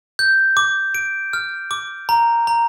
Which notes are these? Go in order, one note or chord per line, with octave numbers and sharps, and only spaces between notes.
G6
D6
D7
F6
D6
A#5
A#5